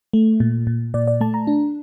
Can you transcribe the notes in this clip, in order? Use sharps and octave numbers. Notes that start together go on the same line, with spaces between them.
A3
A#2
A#2
A#2 D5
D5
A3 A5
A#5
D4